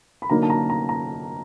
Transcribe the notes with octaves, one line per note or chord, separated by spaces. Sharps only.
B5
D3 F#3 A#3 D#4 A#5
A5
A#5
A#5
A#5